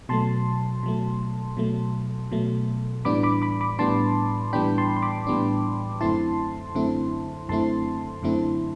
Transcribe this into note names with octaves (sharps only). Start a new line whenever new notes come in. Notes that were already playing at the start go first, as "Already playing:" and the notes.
B2 F#3 A3 A5 C6
B2 F#3 A3
B2 F#3 A3
B2 F#3 A3
A2 E3 G3 B3 D4 B5 D6
B5 D6
B5 D6
B5 D6
A2 E3 G3 B3 D4 A5 C6
A2 E3 G3 B3 D4 G5 B5
A5 C6
C6
B5 D6
A2 E3 G3 B3 D4
F#2 D3 A3 C4 E4 A5 C6
F#2 D3 A3 C4 E4
F#2 D3 A3 C4 E4 A5 C6
F#2 D3 A3 C4 E4